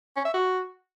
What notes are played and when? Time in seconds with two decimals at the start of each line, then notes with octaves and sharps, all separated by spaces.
0.16 C#4
0.25 E5
0.34 F#4